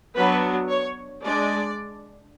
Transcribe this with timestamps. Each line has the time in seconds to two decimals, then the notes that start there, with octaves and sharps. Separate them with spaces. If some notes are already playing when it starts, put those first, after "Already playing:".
0.16 F#3 B3 D4 B4
0.69 C#5
1.23 G#3 D4 D5